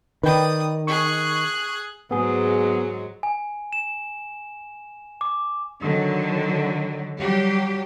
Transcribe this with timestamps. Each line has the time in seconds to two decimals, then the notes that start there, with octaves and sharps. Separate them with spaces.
0.23 D#3 B4 D5 G5 D#6
0.87 G#4 C#6 F#6
2.11 G#2 F#3 G#3 B3 G#4
3.23 G#5
3.73 E7
5.21 D6
5.82 D3 D#3 F#3
7.19 F#3 G3 G4